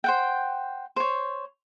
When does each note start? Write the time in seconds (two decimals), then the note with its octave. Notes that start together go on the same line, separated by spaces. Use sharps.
0.04 C5 F#5 G5
0.96 C5 C#5